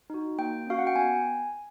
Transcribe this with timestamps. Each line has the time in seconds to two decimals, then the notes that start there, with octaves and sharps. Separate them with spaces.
0.10 D#4 F#4
0.38 A#3 G5
0.67 C#4 F#4 F5
0.79 F#5
0.87 G5
0.96 B3 G#5